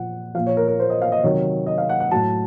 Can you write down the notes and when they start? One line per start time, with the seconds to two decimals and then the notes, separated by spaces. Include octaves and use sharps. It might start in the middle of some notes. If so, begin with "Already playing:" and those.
Already playing: A#2 F3 F#5
0.34 F3 F5
0.38 A#2
0.46 C#5
0.57 A#4
0.68 A#4
0.80 C5
0.90 D#5
1.02 F5
1.12 D#5
1.23 C3 D#3 F#3 C#5
1.67 D#5
1.78 F5
1.89 F#5
2.00 F#5
2.11 A2 F#3 A5